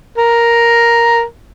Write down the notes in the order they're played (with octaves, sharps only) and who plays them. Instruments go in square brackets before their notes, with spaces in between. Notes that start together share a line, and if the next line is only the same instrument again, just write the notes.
[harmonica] A#4